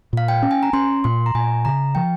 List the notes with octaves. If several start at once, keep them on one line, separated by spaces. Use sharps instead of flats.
A#2 F5
G5
C#4
G#5
A#5
C#4 C6
A#2 C6
A#5
A#2 G#5
C#3 A#5
F3 G5